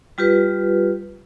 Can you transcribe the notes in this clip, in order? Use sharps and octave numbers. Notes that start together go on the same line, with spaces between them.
G3 F4 G4 B4